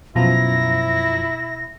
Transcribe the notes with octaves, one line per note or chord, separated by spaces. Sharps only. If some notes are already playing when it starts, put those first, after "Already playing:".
F#2 B2 F3 E4 A#5 A#6